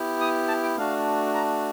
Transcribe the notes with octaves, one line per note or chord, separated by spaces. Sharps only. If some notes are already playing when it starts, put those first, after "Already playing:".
Already playing: B3 E4 G4
D#6
A5
G5
A3 D4 F#4 F5
A#5